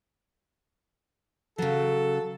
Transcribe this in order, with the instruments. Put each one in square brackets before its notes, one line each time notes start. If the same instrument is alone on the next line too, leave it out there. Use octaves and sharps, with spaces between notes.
[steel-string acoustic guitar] C#3 F#3 [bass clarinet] A4